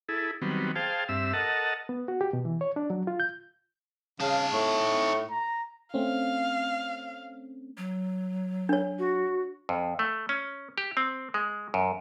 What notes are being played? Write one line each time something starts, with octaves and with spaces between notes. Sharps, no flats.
E4 G#4 A4
D#3 F#3 G3 B3 C4
G#4 C5 F5 G5 A5
G2 C4 E5 E6
A4 A#4 D#5 F#5 A5
B3
F#4
G4
B2
E3
C#5
D4
F#3
F4
G6
C#3 D#4 F5 A5
A2 C#6
A#5
A3 C4 C#4 F5
F#3
D4 C#5
F#4
F2
A3
C#4
G4
C4
G#3
F#2